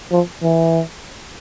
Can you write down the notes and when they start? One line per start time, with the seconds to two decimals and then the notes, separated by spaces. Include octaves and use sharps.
0.11 F3
0.43 E3